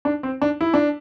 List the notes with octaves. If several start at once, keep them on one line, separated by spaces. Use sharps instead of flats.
D4
C4
D4
E4
D4